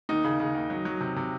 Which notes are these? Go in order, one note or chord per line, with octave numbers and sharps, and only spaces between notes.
D#2 D#4
C#3
C#3
D#2
F#3
F#3
C3
C3